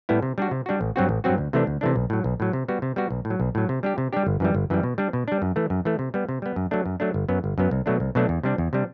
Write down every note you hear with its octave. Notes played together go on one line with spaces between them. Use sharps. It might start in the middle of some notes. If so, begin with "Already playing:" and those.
A2 G3 B3 E4
C3
G3 D4 F#4
C3
G3 D4 F#4
A1
G2 F#3 C4 F#4
A1
G2 F#3 C4 F#4
D2
C3 E3 A3 D4
D2
C3 E3 A3 D4
B1
A2 F#3
B1
A2 F#3
C3
G3 B3 F#4
C3
G3 B3 F#4
B1
A2
F#3
B1
A2 F#3
C3
G3 D4 G4
C3
G3 D4 G4
G1
F#2 E3 G3
G1
F#2 E3 G3
B2
G3 D4
B2
G3 D4
F#2
E3 A3
F#2
E3 A3
C3
G3 B3
C3
G3 B3
F#2
F#3 A3 D4
F#2
F#3 A3 D4
G1
F#2 F#3 B3
G1
F#2 F#3 B3
C2
B2 F#3 A3 D4
C2
B2 F#3 A3 D4
E2
C3 G3 D4
E2
C3 G3 D4